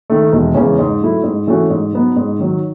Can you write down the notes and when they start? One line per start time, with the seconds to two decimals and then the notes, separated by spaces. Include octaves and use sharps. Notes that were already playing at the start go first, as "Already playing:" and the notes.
0.10 D#3 A3
0.32 E1
0.55 E2 C#3 G#3 C#4
0.79 G#2
1.02 F#3 A3 E4
1.24 G#2
1.47 E3 A3 C#4 F#4
1.70 G#2
1.93 F#3 B3 D#4
2.16 G#2
2.39 D#3 F#3